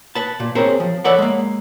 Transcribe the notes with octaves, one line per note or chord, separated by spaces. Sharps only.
B4 A5
A#2
C4 G#4 A#4 C5 C#5
F3
A4 B4 C#5 D5 E5 F#5
G#3 A#3